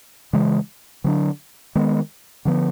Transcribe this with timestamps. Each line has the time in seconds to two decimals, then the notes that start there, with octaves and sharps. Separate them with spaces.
0.33 C#3 E3 G#3
1.04 D3 F#3 B3 D4
1.75 D#3 G#3 B3
2.45 D3 F3 G#3 B3